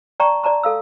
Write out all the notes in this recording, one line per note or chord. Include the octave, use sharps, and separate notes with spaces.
D5 G5 A5 A#5 C#6
D5 A5 A#5 C6
A4 F5 E6